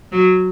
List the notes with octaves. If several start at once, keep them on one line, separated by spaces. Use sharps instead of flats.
F#3